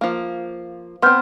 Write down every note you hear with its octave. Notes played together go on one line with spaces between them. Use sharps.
F3 A#3
B3 C4 C6 F6 G6